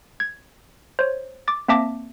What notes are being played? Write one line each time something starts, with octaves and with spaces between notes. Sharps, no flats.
G#6
C5 C#5
D6 A6
A#3 C4 E5 A5 D6 A#6